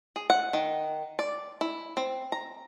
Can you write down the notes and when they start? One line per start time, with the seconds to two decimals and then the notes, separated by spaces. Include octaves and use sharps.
0.16 G#4
0.30 F#5
0.53 D#3
1.19 D5
1.61 E4
1.97 C4
2.32 A#5